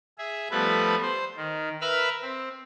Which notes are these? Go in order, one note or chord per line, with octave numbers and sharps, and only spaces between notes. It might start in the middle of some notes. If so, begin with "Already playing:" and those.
G#4 E5
F3 G3 A3 B3 A4 B4
C5
D#3
A#4 B4 E5 B5 E6 F6
C4